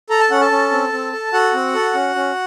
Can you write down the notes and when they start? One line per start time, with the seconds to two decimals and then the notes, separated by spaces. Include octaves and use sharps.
0.10 A4 A#5
0.20 A5
0.31 C#4 F#5
0.41 A4 A5
0.51 C#4
0.72 C4
0.92 C4
1.13 A4
1.33 F#4 A4 F#5
1.54 C4
1.74 A4
1.94 C#4
2.15 C#4